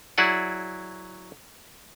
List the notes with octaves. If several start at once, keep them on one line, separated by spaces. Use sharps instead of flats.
F#3 E4 G#4 D5 F#5